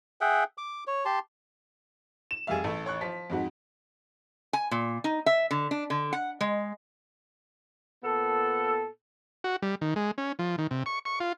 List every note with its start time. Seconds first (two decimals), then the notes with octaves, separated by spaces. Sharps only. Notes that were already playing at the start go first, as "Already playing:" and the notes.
0.21 G#4 E5 F#5 G5
0.58 D6
0.87 C#5
1.05 G4 A5 C6
2.31 E7
2.47 F1 G3 G#4 E5 F5
2.64 A1 A3
2.86 C#5 C#6 F#6
3.01 F3 B6
3.30 F2 G#2 F#4
4.53 G#5
4.71 A#2
5.04 D#4
5.26 E5
5.51 D3
5.71 D4
5.90 D3
6.13 F#5
6.41 G#3
8.04 A#2 B3 A4
9.44 F#4
9.62 G3
9.81 D#3
9.96 G#3
10.18 C#4
10.39 F3
10.58 D#3
10.71 C3
10.86 C#6
11.05 C#6
11.20 F4